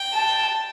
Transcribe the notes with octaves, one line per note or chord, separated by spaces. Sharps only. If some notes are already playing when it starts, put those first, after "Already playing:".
Already playing: G5
A5